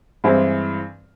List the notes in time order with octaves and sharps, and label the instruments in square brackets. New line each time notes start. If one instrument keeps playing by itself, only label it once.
[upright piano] G2 E3 G#3 C4 E4